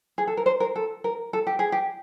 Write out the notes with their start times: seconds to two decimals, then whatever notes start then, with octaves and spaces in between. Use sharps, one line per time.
0.18 G#4
0.28 A4
0.37 A#4
0.46 C5
0.60 A#4
0.76 A4
1.04 A#4
1.33 A4
1.47 G4
1.59 G#4
1.72 G4